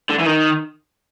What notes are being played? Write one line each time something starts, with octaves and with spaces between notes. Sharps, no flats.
D3
E3
D#3